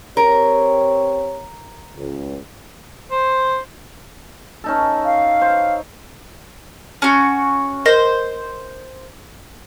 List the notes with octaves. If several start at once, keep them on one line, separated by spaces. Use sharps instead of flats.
C4 G4 A#4 C#5
C#2
C5
C#4 D#4 A4
F5
C5
C#4 F#4
A#4 C5 D#5 A#6